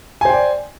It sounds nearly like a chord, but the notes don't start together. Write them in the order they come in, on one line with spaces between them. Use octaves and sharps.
G#5 C5 G5 D5